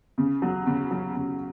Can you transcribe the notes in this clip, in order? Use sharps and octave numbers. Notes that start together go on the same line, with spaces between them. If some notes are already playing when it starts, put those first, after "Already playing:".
C#3
F#3
C#3
F#3
C#3